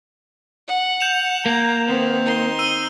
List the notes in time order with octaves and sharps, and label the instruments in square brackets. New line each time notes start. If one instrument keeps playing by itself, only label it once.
[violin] F#5
[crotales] G6 E7 F7
[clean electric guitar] A#3 [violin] A#5
[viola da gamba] D#3 C4 [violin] B3
[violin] D#4 C6
[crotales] E6 D#7 G7